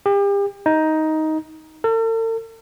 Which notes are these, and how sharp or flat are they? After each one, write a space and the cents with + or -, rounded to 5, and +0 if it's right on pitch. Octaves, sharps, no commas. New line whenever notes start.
G4 +35
D#4 +10
A4 +45